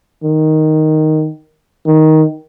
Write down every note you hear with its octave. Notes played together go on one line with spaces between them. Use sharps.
D#3
D#3